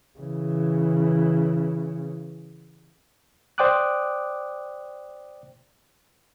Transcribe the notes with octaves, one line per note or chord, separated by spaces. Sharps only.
C#3 E3
C5 D5 G5 D6 D#6 F#6